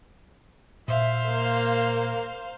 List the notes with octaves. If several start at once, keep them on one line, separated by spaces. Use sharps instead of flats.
A#2 C5 E5 F5
A#3